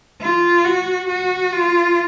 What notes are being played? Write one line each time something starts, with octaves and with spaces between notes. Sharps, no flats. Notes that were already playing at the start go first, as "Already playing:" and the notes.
F4
F#4
F#4
F4